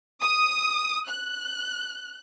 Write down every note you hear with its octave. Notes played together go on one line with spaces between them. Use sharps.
D#6
F#6